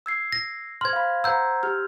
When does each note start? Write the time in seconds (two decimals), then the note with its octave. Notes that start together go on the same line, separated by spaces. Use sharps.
0.06 E6 G#6 C7
0.32 A#6
0.81 C5 C6 F6 G#6
0.93 F5 B5
1.24 C5 F#5 A#5 E6 G6
1.63 G4 F6